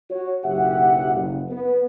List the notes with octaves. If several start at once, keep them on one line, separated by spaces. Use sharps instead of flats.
F#4 C#5
F#1 B1 G4 E5 F#5
F#1
B3 B4